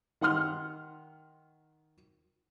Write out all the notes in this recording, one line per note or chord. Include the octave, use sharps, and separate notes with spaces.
D#3 F#5 C6 F6